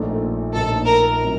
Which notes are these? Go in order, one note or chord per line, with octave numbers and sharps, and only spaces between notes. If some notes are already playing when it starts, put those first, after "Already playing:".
Already playing: A#1 A#2 A3 D#4
A#1 A#2 A3 D#4 A4
A#4
A2 F#3 C4 D#4